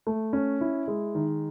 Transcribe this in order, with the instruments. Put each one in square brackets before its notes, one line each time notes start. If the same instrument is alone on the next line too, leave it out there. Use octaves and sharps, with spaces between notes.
[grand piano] A3
C#4
E4
G#3
D#3